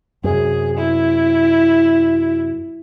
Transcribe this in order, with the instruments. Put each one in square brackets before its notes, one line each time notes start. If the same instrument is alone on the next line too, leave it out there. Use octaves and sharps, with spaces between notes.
[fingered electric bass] F#2 C3 [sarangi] G#4
[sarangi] E4